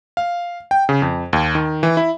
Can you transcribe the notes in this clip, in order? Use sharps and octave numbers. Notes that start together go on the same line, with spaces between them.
F5
G5
C#3
F2
D#2
D#3
E3
E4